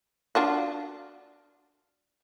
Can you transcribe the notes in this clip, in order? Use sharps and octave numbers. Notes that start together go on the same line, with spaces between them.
D4 F4 F#4